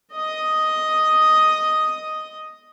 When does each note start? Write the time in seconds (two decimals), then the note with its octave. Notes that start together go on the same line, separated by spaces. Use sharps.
0.13 D#5 D#6